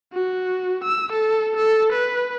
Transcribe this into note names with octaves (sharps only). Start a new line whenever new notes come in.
F#4
E6
A4
A4
B4